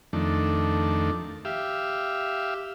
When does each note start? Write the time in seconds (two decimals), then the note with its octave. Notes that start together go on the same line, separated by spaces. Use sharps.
0.13 F2 D#3 A3 D4
1.45 G4 E5 F5